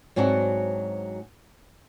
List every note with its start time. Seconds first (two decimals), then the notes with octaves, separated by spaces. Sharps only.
0.16 G#2 F#3 C4 D4 F#4